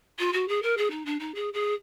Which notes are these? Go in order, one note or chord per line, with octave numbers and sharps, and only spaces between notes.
F4
F#4
G#4
A#4
G#4
D#4
D4
D#4
G#4
G#4